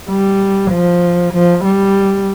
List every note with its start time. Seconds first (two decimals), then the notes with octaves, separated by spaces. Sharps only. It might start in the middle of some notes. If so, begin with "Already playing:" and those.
0.10 G3
0.72 F3
1.34 F3
1.65 G3